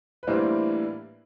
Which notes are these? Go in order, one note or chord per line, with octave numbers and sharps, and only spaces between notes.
B4
A2 E3 G3 A#3 D4 C5